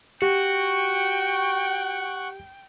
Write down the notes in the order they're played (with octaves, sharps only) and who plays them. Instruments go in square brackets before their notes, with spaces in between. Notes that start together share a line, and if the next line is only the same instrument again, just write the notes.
[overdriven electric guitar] F#4 [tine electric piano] G4 [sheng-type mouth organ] F#5 C#6 [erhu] G5